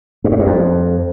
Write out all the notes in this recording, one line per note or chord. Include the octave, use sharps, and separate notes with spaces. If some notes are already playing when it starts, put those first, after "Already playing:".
G2
G#2
G2
F2